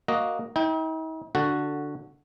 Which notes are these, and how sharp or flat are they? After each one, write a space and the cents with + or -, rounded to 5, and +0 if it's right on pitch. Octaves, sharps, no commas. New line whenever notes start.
A#3 +0 F#4 +0 D#5 +0
D#4 +45 G5 +0
D3 +0 F#4 +0 A4 +10